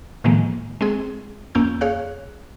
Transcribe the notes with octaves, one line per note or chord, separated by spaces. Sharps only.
A2 D#3 F3 G#3 A#3
G#3 C4 G#4
F2 A#3 C#4 E6 G6
G#4 C#5 F5 F#6